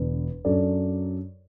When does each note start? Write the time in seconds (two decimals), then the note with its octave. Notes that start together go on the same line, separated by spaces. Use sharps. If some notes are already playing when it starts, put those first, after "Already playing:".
Already playing: E1 E2 D3 B3 D4
0.45 F#2 F#3 D4 A4 D5